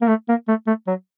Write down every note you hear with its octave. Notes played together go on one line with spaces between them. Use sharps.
A#3
A3
A#3
A3
A3
F#3